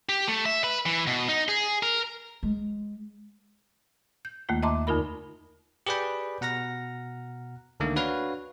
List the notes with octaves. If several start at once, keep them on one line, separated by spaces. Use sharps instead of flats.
G4
A3
E5
B4
E3
B2
D#4
G#4
A#4
G#3
G6
D#2 D#3 A3 A#3 F4
D#5 E5 A5 A#5 C6 D6
F2 D3 D#4 F4 A#4 B5
G4 G#4 B4 D5 G5 B5
B2 F#5 A#5 F6 A#6
C#2 D3 D#3 A3 A#3
D4 F#4 B4 C#5 F5